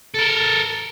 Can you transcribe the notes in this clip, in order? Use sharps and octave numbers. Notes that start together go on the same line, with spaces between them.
A4 A#4